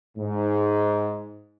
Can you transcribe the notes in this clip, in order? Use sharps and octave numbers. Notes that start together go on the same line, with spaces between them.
G#2